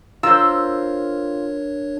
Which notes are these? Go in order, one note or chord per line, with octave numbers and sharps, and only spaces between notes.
D4 F4 A#4 C5 C#5 E6